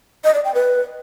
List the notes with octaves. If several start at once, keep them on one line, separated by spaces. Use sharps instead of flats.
D#5
D5
G5
B4